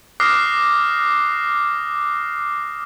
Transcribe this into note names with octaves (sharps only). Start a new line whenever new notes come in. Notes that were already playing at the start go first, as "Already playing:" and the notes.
D6 D#6 F6 F#6 A#6 C7